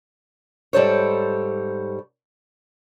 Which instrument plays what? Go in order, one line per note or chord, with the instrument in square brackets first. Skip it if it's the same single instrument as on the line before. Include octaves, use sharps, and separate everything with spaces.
[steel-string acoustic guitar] G#2 G3 A4 C5 C#5